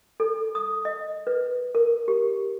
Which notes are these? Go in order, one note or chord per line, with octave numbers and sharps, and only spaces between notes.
A4
D#6
D#5
B4
A#4
G4